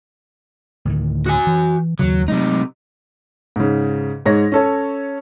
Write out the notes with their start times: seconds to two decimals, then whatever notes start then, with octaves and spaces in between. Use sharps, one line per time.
0.85 D2 A2 D#3
1.26 F#4 G#5
1.47 E3
1.99 D#2 C#3 F#3
2.28 C3 F#3 G#3 A3 D#4
3.56 G#2 C#3
4.26 G#2 G#3 C#5 A#6
4.52 C#4 A4 C#5